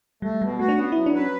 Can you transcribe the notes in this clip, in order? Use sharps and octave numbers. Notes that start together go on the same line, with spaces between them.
G3 A3
B2 G3
A3 F#4
D4
B3 C#4
F#3 E4
D4
C#4 B4